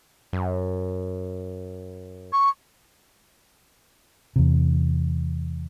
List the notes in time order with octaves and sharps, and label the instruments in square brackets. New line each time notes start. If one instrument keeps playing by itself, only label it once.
[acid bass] F#2
[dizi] C#6
[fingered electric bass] E2 C3